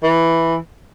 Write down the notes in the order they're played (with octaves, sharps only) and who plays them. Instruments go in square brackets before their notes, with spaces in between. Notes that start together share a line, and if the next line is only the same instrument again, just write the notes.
[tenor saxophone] E3